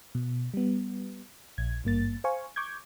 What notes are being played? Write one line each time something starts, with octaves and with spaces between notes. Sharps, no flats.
B2
G3 B3
A#1 G#6
G#1 G2 A#3 A6
C5 F5 G#5 C#6
C#6 D6 G6 G#6